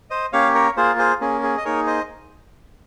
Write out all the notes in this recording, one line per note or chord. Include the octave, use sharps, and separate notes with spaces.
C5 D#5
A#3 C#4 G4 C#5 F5
A#4 C#5
A#3 F4 G#4 C5
G#4 C5
A#3 C#4 G#4
G#4
D#5
A#3 D#4 G#4 A#4 C#5
C5 D#5